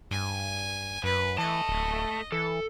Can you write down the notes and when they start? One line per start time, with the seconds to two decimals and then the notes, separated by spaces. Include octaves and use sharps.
0.11 G2 G#5
1.04 F#2 B4
1.38 E3 A3 D#5 A5
1.69 D1
2.32 E3 A4